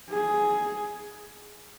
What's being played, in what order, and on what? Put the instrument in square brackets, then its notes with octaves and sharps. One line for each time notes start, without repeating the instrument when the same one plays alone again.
[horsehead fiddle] G#4